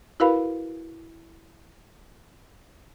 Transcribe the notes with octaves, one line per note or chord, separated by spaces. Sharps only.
E4 F#4 A#4 B4 F5 B5